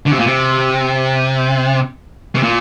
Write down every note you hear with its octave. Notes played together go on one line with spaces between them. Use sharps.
D3
C3
A#2
C3
C3
A#2